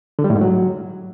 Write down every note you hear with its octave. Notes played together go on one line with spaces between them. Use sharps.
D3
G3
A2
G#2
F#3